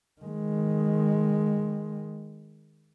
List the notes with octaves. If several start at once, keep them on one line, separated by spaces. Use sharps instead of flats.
D#3 G#3